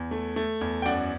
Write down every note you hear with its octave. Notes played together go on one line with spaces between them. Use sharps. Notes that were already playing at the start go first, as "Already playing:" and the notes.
Already playing: E2
A3
A3
E2
G5
F#2 D5 F#5